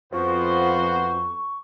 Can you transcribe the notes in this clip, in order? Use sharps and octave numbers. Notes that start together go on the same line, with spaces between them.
F2 F3 B3 F#4 C5 C#6